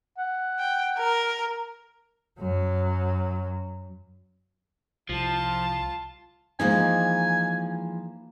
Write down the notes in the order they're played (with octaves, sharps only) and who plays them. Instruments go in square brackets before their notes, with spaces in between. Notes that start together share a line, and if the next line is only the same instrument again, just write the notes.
[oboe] F#5
[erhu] G5
A#4
[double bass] F#2 F#3
[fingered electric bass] C2 [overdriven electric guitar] F3 [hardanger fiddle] F4 A5
[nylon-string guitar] E3 F3 G#3 [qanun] A#3 D#4 [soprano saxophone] G#5